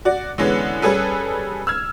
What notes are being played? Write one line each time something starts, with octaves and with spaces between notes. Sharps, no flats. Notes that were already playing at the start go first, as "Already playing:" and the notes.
F#4 D5
D3 E3 G#3 B3 C#4
G3 C#4 G#4 A4 B4
E6 F6 G#6